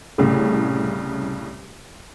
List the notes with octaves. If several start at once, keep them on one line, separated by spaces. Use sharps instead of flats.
C2 A2 C#3